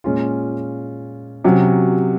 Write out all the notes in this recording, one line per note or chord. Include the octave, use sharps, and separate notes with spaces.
A#2 G#3 C#4 F4
C3 F#3 C#4